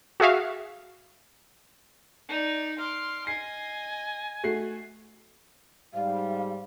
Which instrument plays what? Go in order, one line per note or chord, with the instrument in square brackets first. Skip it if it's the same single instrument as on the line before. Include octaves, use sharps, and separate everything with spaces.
[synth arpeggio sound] F#4 G#4 E5 F5
[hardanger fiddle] D#4 D5
[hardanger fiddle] C6 D6 [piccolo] F6
[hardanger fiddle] D#5 [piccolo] G#5 [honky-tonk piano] C7
[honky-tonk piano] A3 F#4 C7
[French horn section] G#2 G3 [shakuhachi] F5